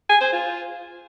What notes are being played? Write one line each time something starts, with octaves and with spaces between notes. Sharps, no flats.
G#5
C5
F4